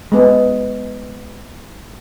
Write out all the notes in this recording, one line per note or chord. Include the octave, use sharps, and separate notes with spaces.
G#3 B3